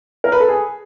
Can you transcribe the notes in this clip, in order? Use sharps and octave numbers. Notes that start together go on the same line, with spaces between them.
A#4
B4
A4
G#4